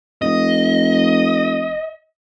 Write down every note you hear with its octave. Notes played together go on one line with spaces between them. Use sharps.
F1 D#5